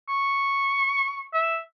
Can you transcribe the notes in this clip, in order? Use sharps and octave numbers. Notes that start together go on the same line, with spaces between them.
C#6
E5